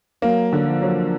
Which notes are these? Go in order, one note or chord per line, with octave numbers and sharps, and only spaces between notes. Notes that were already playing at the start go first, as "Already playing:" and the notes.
F#3 A#3
D3
F3
F#3